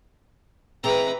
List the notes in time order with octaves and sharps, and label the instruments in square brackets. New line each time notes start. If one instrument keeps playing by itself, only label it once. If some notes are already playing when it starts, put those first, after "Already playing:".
[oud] E3 G#3 C4 [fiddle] B4 A#5